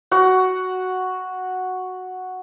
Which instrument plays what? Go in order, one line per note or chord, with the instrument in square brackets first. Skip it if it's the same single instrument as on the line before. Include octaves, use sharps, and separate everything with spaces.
[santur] F#4 F#5